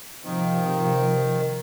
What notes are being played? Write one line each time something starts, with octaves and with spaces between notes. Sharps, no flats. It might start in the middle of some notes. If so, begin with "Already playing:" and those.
C3 D#3 F3